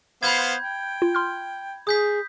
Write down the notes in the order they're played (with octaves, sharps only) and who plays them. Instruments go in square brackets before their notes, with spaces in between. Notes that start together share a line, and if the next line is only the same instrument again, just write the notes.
[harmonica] B3 C5 F5 [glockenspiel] B5 G6 G#6
[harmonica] G5
[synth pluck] F4
C6 F6
[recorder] G#4 [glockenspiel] D#6 G6 B6